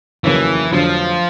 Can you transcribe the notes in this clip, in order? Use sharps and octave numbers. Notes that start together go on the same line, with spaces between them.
F1 D#2 C#3 E3 F#3 A#3
F1 F2 D3 F3 F#3